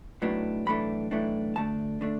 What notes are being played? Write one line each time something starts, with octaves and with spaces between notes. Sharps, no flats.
B1 A2 F#3 B3 D4
B1 A2 E3 A3 D4 B5
B1 A2 E3 A3 D4
D2 D3 A3 D4 A5
D3 A3 D4